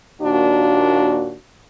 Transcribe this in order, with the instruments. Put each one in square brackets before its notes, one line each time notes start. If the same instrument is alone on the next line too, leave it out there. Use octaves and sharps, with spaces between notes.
[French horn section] D#2 A#2 D4 F#4